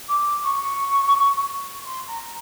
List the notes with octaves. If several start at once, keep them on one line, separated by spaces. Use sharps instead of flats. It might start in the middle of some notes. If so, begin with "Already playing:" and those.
D6
C#6
C6
A#5